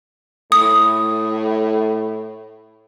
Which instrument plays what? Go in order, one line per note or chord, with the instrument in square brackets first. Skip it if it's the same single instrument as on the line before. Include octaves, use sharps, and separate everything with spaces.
[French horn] A2 [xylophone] D#6